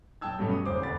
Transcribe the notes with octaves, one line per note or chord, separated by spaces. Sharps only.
B1 G5 A5 E6 G#6
G2 B2 F#3 G3 A3 C#4
D#6
F#1 G#4 C5 D6
F1 D2 B5 A6